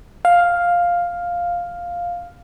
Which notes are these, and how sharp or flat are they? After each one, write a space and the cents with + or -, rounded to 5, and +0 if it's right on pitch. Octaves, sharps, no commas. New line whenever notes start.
F5 +5